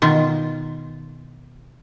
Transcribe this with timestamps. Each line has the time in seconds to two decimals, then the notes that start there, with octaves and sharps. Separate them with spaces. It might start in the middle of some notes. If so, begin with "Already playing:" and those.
0.02 B2 D#3 F4